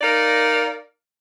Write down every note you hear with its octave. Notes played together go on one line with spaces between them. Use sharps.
D#4 A#4 D5 F5